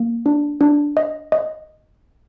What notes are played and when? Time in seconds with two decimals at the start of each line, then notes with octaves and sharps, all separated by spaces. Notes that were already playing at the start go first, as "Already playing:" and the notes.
Already playing: A#3
0.26 D4
0.61 D4
0.97 D#5
1.32 D#5